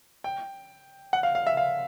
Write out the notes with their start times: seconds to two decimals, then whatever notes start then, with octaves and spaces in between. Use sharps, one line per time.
0.24 G5
1.13 F#5
1.23 F5
1.35 F5
1.47 E5
1.57 F5